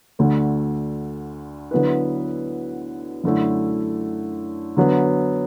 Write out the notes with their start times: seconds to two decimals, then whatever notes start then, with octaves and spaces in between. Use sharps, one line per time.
0.19 D2 D3 A3
1.71 D3 F#3 B3 E4 B4
3.24 F#2 D3 A3 E4
4.77 D3 F#3 B3